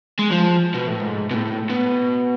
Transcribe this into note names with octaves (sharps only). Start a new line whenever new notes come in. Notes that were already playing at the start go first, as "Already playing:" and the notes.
G#3
F3
B2
A2
G#2
B2
A2
B2